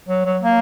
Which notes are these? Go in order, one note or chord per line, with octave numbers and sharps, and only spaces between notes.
F#3
F#3
A#3